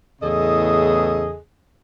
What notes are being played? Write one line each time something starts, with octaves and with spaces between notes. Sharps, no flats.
E2 A2 C#3 G#4 A4 D#5